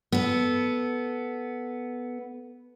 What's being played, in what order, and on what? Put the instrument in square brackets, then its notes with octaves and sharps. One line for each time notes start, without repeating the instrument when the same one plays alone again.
[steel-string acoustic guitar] B3 A4